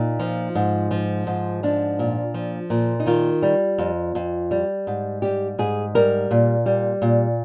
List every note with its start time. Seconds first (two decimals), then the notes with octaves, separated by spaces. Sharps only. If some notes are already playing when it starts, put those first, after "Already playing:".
Already playing: A#2 D#4
0.20 F3
0.55 G#2
0.91 F3
1.27 G#2
1.63 F3 D4
1.99 A#2
2.34 F3
2.70 A#2
3.00 D#4
3.06 D#3 F4
3.42 G3
3.78 F2
4.15 F2
4.51 G3
4.87 G#2
5.22 G3 G4
5.59 G#2 G#4
5.95 G3 A#4
6.31 A#2
6.66 G3
7.02 A#2